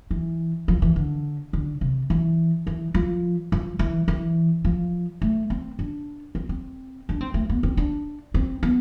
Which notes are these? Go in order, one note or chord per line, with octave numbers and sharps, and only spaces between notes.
E3
F3
E3
D3
D3
C3
E3
E3
F3
F3
E3
E3
F3
A3
C4
D4
C4
C4
D4
C4
A3
B3
C4
D4
C4
B3